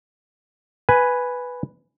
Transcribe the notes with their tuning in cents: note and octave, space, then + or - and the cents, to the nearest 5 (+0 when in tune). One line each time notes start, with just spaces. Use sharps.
B4 +0 G#5 +0